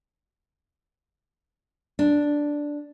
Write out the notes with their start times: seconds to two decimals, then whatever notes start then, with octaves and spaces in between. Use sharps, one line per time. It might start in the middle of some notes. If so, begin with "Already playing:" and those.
1.99 D4